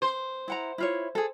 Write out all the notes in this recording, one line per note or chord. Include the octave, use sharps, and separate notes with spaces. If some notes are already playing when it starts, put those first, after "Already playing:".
C5
E4 F#5 A#5
E4 F4 C#5
G#4 A4